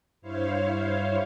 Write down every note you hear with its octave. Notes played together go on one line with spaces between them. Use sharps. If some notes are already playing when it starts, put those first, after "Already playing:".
G2 E4 C5 C#5 F5